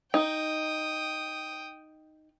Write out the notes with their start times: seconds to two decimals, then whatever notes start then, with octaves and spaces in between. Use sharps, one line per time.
0.14 D#4 G5 D#6